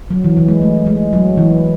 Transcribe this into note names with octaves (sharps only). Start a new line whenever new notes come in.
F#3
E3
E3
G#3
A3
G#3
F#3
E3